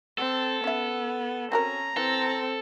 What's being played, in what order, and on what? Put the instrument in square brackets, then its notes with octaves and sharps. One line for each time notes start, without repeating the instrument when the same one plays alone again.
[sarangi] C4 [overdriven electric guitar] A4
[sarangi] B3 [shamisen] C#4 E5
[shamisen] C4 F#4 A#4 [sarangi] C#4 [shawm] A#5
[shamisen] E3 [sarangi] C4 [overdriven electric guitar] A4